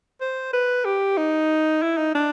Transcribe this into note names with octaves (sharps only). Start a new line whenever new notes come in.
C5
B4
G4
D#4
E4
D#4
D4